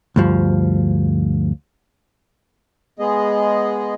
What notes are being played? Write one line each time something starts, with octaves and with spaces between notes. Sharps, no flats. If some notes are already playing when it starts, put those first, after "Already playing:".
D2 G2 F3
G#3 B3 G#4 D#5